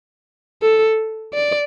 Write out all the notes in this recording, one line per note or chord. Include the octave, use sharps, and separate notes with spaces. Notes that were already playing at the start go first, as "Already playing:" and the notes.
A4
D5